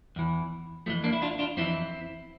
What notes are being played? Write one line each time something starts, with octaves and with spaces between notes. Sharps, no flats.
E2 E3
F2 E3 F3 A3
A#3 D4
E4
D4 F4
D4 F4
F2 E3 C4 E4